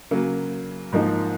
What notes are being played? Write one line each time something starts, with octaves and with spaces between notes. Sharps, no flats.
C#3 F#3 A#3
G#2 F3 A#3 D#4